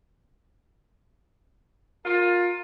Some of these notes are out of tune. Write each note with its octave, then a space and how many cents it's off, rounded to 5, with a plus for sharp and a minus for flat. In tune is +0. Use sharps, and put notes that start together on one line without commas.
F4 +20 A#4 +0